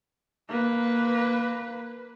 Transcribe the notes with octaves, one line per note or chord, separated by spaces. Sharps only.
A#3 B4